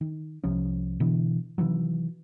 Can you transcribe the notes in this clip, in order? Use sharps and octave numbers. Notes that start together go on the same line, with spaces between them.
D#3
C2 C3 F3 C#4
B2 D3 E3
C3 D#3 E3 F#3